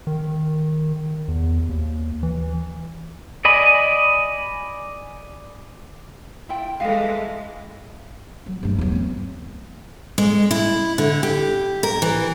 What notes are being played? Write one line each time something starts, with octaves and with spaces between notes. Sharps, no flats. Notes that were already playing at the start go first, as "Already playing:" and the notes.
D#3
E2
D#2
E3
D5 D#5 G#5 B5
E4 F4 G5
E3 G#3 A4 F5
F#3
G2 A3
E2 F#3
B3 C4
G#3
E4
D3
G4
A#4
E3